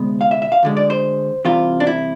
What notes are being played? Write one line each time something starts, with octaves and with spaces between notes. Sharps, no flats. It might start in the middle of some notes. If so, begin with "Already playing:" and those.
Already playing: D2 C3 G#3 B3
F5
E5
E5
F5
D2 D3 G#3
D5
C5
C2 C3 E3 F4
D4
E4